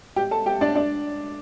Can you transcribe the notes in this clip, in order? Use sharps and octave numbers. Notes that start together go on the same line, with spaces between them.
G4 G5
A4 A5
G4 G5
D4 D5
D4 D5